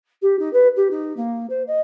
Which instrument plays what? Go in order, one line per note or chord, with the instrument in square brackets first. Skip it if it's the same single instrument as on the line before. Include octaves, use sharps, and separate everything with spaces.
[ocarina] G4
D#4
B4
G4
D#4
A#3
C5
D#5